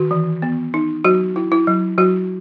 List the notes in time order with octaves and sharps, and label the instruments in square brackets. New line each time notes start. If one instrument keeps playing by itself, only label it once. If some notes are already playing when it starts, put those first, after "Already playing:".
Already playing: [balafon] D#3 F#4
E3
B3
D#4
F#3 F#4
E4
E4
F#3
F#3 F#4